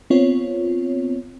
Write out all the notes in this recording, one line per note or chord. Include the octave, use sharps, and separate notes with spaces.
B3 C4 F4 C#5